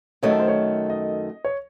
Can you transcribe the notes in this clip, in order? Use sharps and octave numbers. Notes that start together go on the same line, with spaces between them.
F#2 D#3 A3 C#5
A4
C5
C#5
D#5
C#5